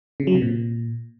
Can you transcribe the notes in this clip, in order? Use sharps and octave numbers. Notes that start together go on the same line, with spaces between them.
C#3
F#3
C3
A#2